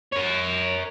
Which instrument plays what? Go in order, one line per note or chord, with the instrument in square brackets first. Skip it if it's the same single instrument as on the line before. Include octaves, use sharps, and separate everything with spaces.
[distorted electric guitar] A#4 C#5